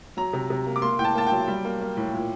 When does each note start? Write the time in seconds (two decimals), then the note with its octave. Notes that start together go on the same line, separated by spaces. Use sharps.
0.17 F#3 A#5
0.33 C3
0.50 C3
0.67 A#3
0.76 D6
0.82 A#3 C6
0.99 A2 G5
1.04 A5
1.15 A#3 A5
1.27 F#3 G5
1.48 G3
1.65 A#3
1.81 A#3
1.97 A2
2.13 A#2